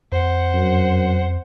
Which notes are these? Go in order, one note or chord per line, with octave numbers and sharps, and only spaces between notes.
F2 C5 F#5
F#2